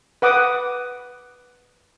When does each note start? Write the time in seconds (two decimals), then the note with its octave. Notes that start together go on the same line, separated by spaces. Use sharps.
0.22 B4 F#5 D6 D#6